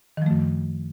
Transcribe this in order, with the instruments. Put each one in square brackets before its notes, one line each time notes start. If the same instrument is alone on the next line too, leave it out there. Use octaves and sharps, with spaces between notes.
[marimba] D#3
F3
A3
F#2